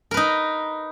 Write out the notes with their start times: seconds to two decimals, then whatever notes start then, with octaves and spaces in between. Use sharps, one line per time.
0.11 A#4
0.14 B4
0.17 D#4